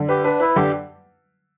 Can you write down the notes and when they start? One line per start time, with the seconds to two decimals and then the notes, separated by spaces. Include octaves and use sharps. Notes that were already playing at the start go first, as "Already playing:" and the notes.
Already playing: D3
0.09 G4 B4
0.24 D4 B4
0.40 E4 B4
0.55 D3 G4